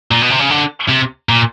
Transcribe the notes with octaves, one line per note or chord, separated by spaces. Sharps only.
A#2
B2
C3
C#3
D3
C3
A#2